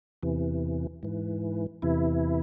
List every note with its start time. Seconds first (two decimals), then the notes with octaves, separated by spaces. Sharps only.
0.23 E2 C3 E3
1.03 G#2 E3
1.82 E2 C3 E3 E4